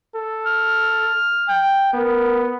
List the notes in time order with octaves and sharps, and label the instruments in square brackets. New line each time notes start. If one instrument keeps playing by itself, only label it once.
[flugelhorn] A4
[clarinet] F6
[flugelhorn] G5
[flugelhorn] B3 [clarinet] A#4